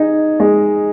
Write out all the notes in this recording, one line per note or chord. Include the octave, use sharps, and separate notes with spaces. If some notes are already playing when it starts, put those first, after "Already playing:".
Already playing: D#4 G#4
G#3